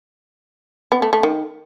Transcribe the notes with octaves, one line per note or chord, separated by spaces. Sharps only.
B3
A3
A3
D#3